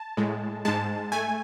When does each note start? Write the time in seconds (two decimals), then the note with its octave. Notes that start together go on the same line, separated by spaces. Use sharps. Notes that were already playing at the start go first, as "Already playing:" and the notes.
Already playing: A5
0.17 A2 G#3
0.65 G#2 G#3 A5
1.12 A3 G#5